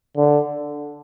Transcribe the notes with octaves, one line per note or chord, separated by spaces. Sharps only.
D3